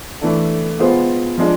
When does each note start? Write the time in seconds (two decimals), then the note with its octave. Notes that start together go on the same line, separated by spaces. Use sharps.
0.21 E3 A3 D4 A4
0.79 G#3 B3 F4 G#4 C5
1.38 F3 G#3 D4